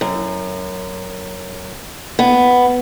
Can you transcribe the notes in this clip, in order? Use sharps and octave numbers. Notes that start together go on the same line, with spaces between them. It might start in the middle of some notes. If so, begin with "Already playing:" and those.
F#2
B3